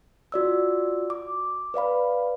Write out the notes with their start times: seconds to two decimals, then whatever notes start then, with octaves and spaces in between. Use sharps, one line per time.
0.32 F4 F#4 D5 E6
1.10 D6
1.74 B4 D5 F5 B5